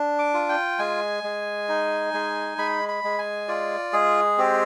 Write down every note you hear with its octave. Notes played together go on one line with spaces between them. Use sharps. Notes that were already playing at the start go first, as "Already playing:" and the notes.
Already playing: D4
D6
F4
G5
G#3 G#5
G#3
D#4
G#3
G#3 B5
B5
G#3
G#5
F4 D5
G#3 G#4
C4 G4